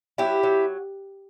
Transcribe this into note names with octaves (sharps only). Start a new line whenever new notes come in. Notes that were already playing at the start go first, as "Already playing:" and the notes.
F#3 E4 G4
F#3